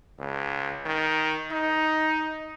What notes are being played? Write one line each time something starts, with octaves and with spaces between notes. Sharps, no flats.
C#2
D#3
D#4